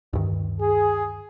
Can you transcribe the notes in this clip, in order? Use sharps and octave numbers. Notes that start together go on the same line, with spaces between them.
D2 G2 D#3
G#4